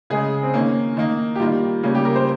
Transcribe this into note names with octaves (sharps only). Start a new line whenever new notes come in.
C#3 G#3 G#4
C4
D#3 A#3 C#4
D#3 A#3 D#4
G4
D#3 G3 A#3 F4
C#3 G3 A#3 C#4
G4
A#4
C5